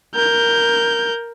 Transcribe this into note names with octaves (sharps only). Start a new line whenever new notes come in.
A#4 G6